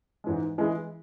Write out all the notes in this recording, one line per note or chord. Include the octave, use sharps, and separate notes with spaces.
G#2 E3 G#3
E3 G#3 E4 G#4